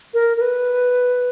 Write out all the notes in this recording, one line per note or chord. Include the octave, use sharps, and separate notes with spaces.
A#4
A#4
B4